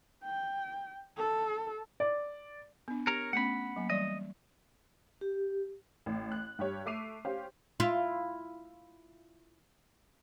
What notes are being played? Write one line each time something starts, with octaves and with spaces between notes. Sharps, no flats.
G5
A4
D5
B3 D4
G4 A#4 C#5 A#5
A3 B3 C#4 F#5 B5
F#3 A#3
E3 G3 D5 D#5
G4
A1
F#6
G2 G4 C#5
A3 E5 D6 C7 D#7 F7
C#4 G4 C5 F5
E4 F4